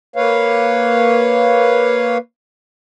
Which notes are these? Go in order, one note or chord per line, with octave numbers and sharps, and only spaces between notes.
A#3 B4 C#5 F5